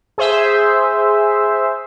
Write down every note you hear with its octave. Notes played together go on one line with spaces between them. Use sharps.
G#4 C5 E5